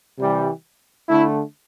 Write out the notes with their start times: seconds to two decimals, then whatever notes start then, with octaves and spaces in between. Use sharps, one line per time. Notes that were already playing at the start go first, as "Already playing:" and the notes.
0.18 C3 E3 G3
1.08 D3 A3 E4